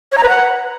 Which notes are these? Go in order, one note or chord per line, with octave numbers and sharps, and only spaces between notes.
C#5
A#5
B4
F#5